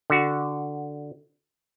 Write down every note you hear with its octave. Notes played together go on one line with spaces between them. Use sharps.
D3 F#4